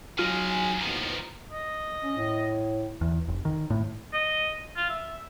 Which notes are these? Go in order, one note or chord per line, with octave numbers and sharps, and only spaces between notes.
D#3 F#3 G#3 F4 G#5 F6
A1 D#2 B2 D#3 F3
D#5
C#4
A2
E2
F1
D#3
A2
D#5
F4
E5